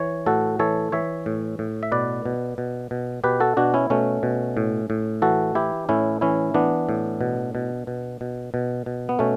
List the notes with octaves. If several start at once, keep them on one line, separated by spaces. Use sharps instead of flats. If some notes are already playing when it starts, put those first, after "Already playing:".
Already playing: E3 C#5
A2 F#4 A4
E3 A4 C#5
E3 C#5 E5
A2
A2
E5
B2 B4 D5
B2
B2
B2
B2 G4 B4
F#4 A4
B2 D4 F#4
C#4 E4
B2 A3 C#4
B2
A2
A2
E3 F#4 A4
E3 E4 G4
A2 C#4 E4
E3 C#4 E4
E3 B3 D4
A2
B2
B2
B2
B2
B2
B2
B3
B2 A3 C#4